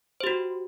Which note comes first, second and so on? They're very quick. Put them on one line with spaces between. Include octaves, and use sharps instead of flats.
C5 G4 F#4